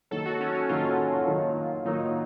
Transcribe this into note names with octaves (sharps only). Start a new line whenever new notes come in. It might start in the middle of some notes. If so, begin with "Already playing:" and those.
D#3 F#3 A#3 A4
F#4
C#4
C#4
D#3 F#3 A#3 F4
D#3 F#3 A#3
D#3 F#3 A#3 D#4